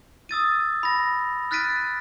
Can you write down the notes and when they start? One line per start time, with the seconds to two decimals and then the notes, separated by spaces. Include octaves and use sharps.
0.29 D#6 E6 A6 D#7
0.83 B5 A#6
1.51 F6 F#6 A6 B6 D7 D#7